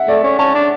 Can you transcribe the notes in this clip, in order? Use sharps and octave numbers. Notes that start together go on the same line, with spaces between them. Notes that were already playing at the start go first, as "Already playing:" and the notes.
Already playing: E5 F#5
A3 D5
C#4
C#4 A5
D4